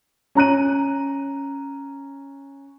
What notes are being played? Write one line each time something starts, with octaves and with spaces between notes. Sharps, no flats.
C#4 A#5 F#6 D#7